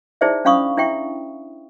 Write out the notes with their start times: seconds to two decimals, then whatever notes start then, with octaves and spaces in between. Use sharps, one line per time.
0.21 D#4 E4 G#4 C5 D5 E5
0.45 C#4 D4 F5 B5 C#6 D#6
0.77 D4 E4 E5 G5 C#6